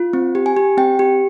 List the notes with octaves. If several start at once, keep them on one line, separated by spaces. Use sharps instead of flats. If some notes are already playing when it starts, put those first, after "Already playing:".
Already playing: F4
C4
G4
G#5
G4
C4 G5
G4